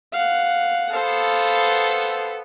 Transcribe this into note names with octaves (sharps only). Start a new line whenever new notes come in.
F5 F#5
B3 A4 C5 F5